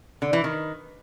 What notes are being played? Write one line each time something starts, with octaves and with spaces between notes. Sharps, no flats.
D3
E3
D#3